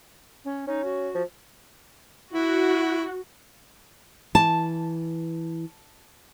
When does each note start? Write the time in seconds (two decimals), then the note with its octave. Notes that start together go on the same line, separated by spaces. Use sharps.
0.45 C#4
0.68 C#4 D#4
0.84 F#4
1.15 F3
2.33 E4 F#4
4.35 E3 A5